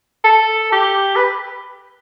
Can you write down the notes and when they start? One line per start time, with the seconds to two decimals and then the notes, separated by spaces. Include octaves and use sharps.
0.24 A4
0.72 G4
1.16 B4